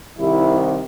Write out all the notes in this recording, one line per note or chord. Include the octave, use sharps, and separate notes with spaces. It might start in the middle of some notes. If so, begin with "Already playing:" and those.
C2 C3 D#3 E4